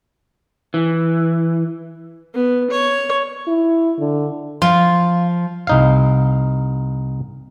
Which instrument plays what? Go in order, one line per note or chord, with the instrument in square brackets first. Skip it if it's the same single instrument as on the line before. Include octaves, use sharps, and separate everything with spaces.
[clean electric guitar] E3
[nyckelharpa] B3
C#5
[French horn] E4
D3
[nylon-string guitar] F3 [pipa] F4
[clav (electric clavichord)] C2 D#4 F5